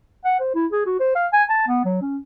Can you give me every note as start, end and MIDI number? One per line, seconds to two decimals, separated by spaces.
0.25 0.35 78
0.40 0.52 72
0.55 0.66 64
0.72 0.82 68
0.86 0.95 66
0.99 1.11 72
1.15 1.27 77
1.33 1.43 80
1.50 1.64 81
1.68 1.82 59
1.85 1.99 54
2.02 2.18 61